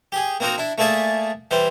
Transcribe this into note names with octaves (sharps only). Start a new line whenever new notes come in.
G4 G#4
A#3 C4 D#4 F#4 A#4
D4 E4
A3 A#3 G#4 D5 E5 A5
E3 G3 C5